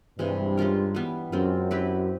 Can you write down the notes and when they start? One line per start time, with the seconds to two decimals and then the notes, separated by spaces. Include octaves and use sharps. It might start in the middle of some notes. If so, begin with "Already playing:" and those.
0.19 G2 C3 E3 G#3
0.57 G#3 C#4 F4 A#4
0.95 E3 G3 B3
1.32 F#2 G#3 C4 F4
1.71 C4 E4 G4 B4